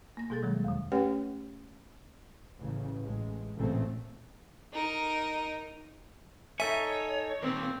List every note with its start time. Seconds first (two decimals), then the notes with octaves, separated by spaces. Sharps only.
0.17 A#3 A#6
0.30 B2 G3 G#4 A4 A6
0.43 D#3 F#3 G#3
0.65 E2 D3
0.92 A3 C#4 G4 B4 C#5 F#5
2.60 A1 C#3
3.02 A1 G#3
3.56 A1 A#2 C#3 A3 C4
4.73 D#4 A#4
6.60 D#4 A4 C#5 E5 G#5
7.42 D#2 A#2 C4